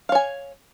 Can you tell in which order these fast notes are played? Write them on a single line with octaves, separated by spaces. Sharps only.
F5 C#5 G#5